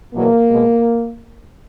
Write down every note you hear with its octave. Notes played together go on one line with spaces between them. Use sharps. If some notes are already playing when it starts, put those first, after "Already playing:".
E2 B2 F#3 A#3
B2 G#3